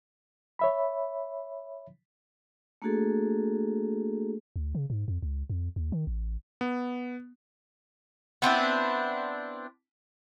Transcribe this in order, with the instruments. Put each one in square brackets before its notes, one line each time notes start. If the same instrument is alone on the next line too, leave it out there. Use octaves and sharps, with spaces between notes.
[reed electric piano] C#5 E5 B5
[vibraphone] A3 A#3 D4 F#4 G#4 A4
[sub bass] D2
C#3
G#2
F2
C#2
F2
D#2
D#3
A1
[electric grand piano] B3
[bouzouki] B3 C4 D4 E4